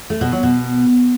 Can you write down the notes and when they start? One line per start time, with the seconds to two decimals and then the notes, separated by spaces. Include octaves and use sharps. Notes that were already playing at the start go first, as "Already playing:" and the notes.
0.10 A3
0.21 B2
0.32 F#3
0.43 B2